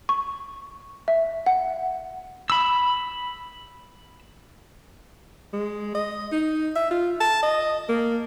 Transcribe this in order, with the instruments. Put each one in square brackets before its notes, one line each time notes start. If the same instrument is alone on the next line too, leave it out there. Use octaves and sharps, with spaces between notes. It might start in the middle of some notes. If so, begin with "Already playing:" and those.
[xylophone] C#6
E5
F#5
[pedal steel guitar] B5 E6
[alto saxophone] G#3
D#5
D#4
E5
F4
A5
D#5
A#3